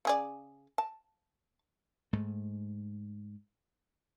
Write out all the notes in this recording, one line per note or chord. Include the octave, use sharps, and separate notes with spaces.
C#3 G#4 D5
A5
G#2 A3